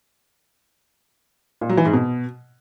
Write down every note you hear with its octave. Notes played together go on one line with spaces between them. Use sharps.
A#2
F#3
E3
G#2
B2